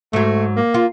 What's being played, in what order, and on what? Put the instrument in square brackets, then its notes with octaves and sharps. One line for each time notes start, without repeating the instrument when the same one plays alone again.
[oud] G#2 F#3 [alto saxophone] A3
[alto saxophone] A#3
[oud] F4